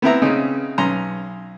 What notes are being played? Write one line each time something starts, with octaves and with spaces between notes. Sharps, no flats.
B3 C4 E4 A#5
C#3 C4 C#4 D#4
B1 C#4 A#5 C6